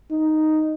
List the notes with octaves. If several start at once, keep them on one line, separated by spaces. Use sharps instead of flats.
D#4